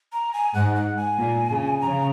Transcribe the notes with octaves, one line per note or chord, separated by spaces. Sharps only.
A#5
G#5
G#2 F#5
F#5
G#5
A#2
C#3
C#3 A#5